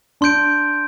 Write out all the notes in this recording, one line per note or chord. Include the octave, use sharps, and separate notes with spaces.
D4 C6 G6 D7